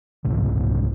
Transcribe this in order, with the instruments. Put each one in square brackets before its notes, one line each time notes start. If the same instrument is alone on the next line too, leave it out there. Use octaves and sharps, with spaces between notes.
[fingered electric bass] D#1 C2 G#2 C#3